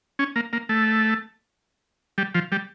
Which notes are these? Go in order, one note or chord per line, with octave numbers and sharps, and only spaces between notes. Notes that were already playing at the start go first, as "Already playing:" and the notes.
C#4
A#3
A#3
A3
G3
F3
G3